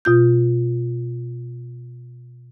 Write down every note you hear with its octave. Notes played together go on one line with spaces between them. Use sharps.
B2 F4 G6